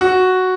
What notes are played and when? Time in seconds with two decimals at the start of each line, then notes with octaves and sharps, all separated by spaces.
0.01 F#4